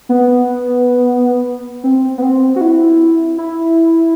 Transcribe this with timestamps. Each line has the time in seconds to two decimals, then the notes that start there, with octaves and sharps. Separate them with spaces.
0.09 B3
1.84 C4
2.18 B3
2.22 C4
2.56 F#4
2.61 E4
3.38 E4